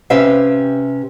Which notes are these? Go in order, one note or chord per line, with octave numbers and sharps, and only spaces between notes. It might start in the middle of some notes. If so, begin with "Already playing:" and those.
C3 C#4 G4 B4 E5 F5